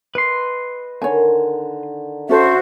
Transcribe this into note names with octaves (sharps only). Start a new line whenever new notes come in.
B4 D#5 C6
D3 D#3 C#5 G#5
C#4 F#4 A4 C5 E5